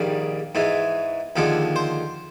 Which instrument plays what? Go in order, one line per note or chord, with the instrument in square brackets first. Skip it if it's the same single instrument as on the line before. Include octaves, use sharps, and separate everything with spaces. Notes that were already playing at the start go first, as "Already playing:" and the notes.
Already playing: [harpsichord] A#1 G#2 D#3 G3 F5
G#2 E3 G#3
D#2 D3 F3 G#3
C5